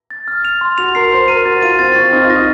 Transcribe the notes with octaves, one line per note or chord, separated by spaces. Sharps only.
A6
F6
F7
C6
F#4 F7
A#4 C7
C5 C6
A#4 D#7
F#4 A6
F4 D#7
C4 A6
C4 C#6
D#4 F6
F4
A#6
D#4